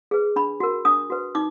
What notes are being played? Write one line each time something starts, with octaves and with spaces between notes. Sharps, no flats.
G#4 B4
D4 B5
F#4 A#4
D4 D#6
F#4 B4
D#4 D6